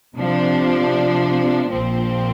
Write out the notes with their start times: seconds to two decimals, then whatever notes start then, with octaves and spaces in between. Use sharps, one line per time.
0.17 C3 F3 D4
1.71 A#1 A#2 F3 C4